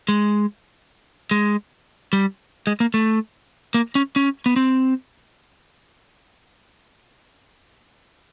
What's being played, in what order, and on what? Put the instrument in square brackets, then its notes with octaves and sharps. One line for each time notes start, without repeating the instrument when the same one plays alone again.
[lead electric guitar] G#3
G#3
G3
G#3
A#3
A3
A#3
C#4
C#4
B3
C4